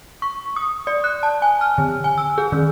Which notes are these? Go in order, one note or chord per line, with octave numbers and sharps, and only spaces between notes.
C#6
D#6
D5
F#6
A5
G#5
F6
D3
G#5
E6
G#4
D#3